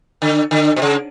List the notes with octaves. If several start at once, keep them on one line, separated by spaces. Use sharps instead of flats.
D3
D3
B2
C#3